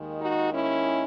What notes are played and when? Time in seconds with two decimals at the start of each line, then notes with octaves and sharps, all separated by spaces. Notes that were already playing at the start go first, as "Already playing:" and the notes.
Already playing: D#2 D#3 G#3
0.21 D#4 F#4
0.54 C#4 E4